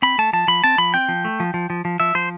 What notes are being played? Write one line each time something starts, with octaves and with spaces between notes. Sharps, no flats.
C4 B5
A3 A5
F3 A5
F3 B5
C4 A5
F3 B5
C4 G5
F3
A3
F3
F3
F3
F3
F3 E5
F3 C5